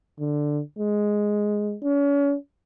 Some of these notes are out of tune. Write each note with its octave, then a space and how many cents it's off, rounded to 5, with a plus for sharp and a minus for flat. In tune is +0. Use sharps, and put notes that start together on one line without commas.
D3 +5
G#3 +0
C#4 +35